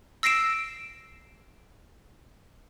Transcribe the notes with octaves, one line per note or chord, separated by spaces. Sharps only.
E6 A#6 C7 D7 E7